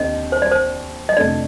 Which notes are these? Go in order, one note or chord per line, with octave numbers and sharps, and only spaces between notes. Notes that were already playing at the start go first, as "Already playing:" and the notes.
Already playing: D#2 D3 C4 D#5
C5
D5
C5
D#5
F1 F2 D3 A3 D4 D5